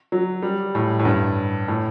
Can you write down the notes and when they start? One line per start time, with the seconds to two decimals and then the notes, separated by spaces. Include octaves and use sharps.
0.12 F#3
0.42 G3
0.75 A2
0.99 A2
1.05 G2
1.68 A2